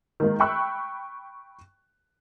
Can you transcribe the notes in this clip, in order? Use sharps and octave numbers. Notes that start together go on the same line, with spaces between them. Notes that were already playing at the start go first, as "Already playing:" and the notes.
D#3 G#3 A#3
G5 B5 C#6 E6 F#6